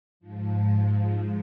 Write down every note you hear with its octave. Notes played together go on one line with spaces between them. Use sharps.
G#2 F3